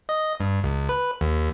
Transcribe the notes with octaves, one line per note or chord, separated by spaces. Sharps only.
D#5
G2
C#2
B4
D#2